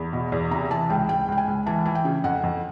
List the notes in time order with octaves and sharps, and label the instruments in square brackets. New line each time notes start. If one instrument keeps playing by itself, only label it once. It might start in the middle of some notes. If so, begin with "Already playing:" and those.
Already playing: [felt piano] E2 B5
B2
E2
C3 A#5
E3 A5
C#2 G5
C#2 G5
C#2 G5
G#5
C#2
E3 A5
E3
G5
C#3
F2 F#5
F2